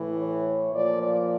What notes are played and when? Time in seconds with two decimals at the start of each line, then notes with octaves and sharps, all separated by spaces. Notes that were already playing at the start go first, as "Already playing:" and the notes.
Already playing: A2 E3
0.16 C#5
0.73 A#2 F3 D5
1.02 D5